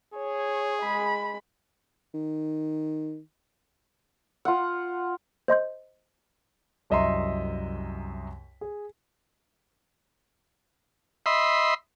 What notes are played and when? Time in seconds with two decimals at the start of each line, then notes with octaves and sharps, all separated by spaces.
0.14 G#4 C#5
0.81 G#3 B5
2.14 D#3
4.45 F4 F#5
5.48 C5 D#5 C6 G6
6.90 C2 F#2 D#5 E5 A#5 C6
8.61 G#4
11.26 D#5 E5 B5 C6